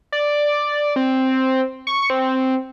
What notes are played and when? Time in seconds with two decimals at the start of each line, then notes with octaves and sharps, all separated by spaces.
0.12 D5
0.96 C4
1.87 C#6
2.10 C4